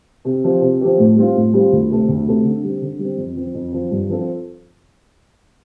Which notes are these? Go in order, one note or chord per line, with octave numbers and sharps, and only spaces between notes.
C3
F3 C4 G4 C5
C3
F3 C4 G4 C5
A2
G3 C4 F4
A2
G3 C4 F4
D2
C3 A3 C4 A4
D2
C3 A3 C4 A4
D3
G3 C4
D3
G3 C4
F2
F3 C4
F2
F3 C4
G2
F3 C4 A4